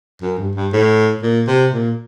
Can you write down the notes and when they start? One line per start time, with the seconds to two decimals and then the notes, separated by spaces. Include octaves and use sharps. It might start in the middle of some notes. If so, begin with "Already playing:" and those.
0.22 F#2
0.38 G2
0.55 G2
0.73 A2
1.22 A#2
1.47 C3
1.72 A#2